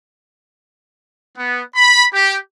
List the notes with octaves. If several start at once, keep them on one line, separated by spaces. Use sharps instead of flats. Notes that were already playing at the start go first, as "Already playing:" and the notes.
B3
B5
G4